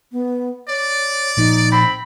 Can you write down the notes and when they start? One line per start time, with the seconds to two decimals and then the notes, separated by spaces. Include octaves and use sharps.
0.12 B3
0.68 C#5 D5
1.37 A#2 F3 D#4
1.72 C4 B5